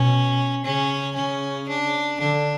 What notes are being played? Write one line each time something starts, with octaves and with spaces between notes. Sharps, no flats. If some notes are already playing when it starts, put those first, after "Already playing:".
Already playing: B2 C#4
C#3 C#4
C#3 C#4
D4
D3 D4